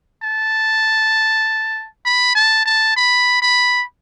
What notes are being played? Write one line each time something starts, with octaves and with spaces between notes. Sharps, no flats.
A5
B5
A5
A5
B5
B5